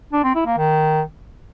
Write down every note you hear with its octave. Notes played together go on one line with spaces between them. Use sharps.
D4
C4
E4
A#3
D#3